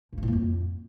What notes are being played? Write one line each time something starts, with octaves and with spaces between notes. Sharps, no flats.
G2
A#3
A2
A#3
F2